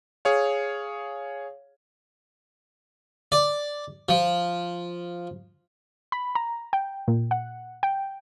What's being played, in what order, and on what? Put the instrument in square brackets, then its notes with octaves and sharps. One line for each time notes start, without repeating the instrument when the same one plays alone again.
[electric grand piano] G#4 C#5 F5
[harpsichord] D5
F3
[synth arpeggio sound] B5
A#5
G5
A#2
F#5
G5